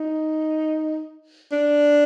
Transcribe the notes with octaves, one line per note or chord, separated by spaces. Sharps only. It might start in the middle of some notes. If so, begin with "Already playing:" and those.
Already playing: D#4
D4